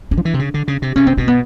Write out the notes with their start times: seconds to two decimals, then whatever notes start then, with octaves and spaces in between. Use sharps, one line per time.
0.11 D4
0.18 F3
0.25 E3
0.34 C3
0.39 C#3
0.54 D3
0.68 C#3
0.82 C3
0.96 C3 C#4
1.07 C4
1.17 B2 C4
1.28 B3